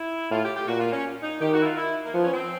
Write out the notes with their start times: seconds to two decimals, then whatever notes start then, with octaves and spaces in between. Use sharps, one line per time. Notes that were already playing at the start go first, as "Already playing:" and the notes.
Already playing: E4
0.31 A2 F4
0.43 G4
0.55 G4
0.67 A#2 F#4
0.80 F4
0.92 C#4
1.22 D#4
1.41 D#3 G4
1.53 F#4
1.61 E4
1.65 F4
1.77 E4
2.05 A#3
2.13 F3 B3
2.24 C#4
2.32 C4